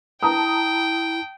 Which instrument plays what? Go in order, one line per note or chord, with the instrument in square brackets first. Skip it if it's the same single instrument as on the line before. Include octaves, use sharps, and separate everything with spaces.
[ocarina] E4 [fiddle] G5 [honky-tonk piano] A5 A#5 D#6